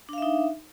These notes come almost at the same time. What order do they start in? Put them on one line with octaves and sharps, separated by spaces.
D4 F5 E5 D#4